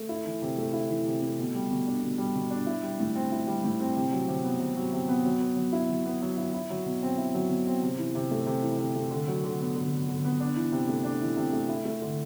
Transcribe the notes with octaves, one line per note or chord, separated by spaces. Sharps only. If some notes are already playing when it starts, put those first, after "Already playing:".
Already playing: A3
E4
E3
C3
A3
E4
E3
C3
A3
B2
G3
B2
D4
B2
G3
B2
D4
E4
G3
A2
C4
E4
G3
A2
C4
C3
F#3
C3
B3
C3
F#3
C3
B3
F#3
B3
F#3
E4
F#3
B3
F#3
E4
E4
F#3
B2
C4
E4
F#3
B2
C4
C3
E3
C3
A3
C3
E3
C3
A3
D3
F#3
D3
B3
D3
F#3
D3
B3
D4
E3
C3
A3
D4
E3
C3
A3
E4
A3
D3